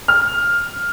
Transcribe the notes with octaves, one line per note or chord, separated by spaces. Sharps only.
F6